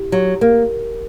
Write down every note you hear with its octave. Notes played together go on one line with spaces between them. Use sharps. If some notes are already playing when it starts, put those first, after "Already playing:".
Already playing: E4 G4
F#3 G4
A#3 A#4